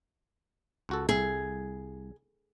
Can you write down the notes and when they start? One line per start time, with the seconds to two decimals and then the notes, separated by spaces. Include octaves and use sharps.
0.89 C#2 F#4 A4
1.09 C2 G#4 E5 G#5